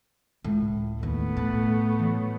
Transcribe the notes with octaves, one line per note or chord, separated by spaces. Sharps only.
C#2 A2
D#2 A3 B3
A2 B5 F#6 A6
E3 F#3